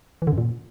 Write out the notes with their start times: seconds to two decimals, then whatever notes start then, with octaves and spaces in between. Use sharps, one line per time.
0.22 E3
0.27 D3
0.32 F#2
0.38 A#2